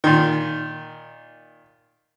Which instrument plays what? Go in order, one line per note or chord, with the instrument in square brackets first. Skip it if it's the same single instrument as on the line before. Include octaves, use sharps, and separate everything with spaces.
[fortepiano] A#2 D#3